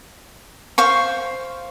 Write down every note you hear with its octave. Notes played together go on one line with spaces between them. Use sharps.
C5 F5 C#6